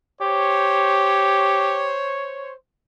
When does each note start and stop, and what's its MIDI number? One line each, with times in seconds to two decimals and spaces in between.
0.21 1.92 67
0.21 2.53 72
0.21 2.53 73